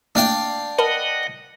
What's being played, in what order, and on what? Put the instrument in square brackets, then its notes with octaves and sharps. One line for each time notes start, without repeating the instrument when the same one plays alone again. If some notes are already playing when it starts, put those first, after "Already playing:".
[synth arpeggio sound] A3 A#3 [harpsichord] D4 F5 G5
[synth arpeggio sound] A#4 A5 B5 [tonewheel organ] D#5 F#5